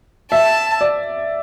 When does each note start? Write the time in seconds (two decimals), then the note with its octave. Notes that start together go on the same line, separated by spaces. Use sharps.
0.31 E5 A5
0.81 D5